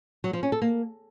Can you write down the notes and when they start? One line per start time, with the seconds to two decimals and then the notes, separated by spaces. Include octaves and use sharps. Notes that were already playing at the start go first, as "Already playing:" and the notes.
0.24 F#3
0.33 F3
0.43 C#4
0.52 A4
0.62 A#3